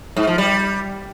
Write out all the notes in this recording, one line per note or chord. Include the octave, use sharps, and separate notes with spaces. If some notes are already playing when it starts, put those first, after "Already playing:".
G#2
F3
G3